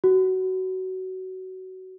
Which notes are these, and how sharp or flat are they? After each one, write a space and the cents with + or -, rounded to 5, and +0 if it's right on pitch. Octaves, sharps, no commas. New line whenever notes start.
F#4 +20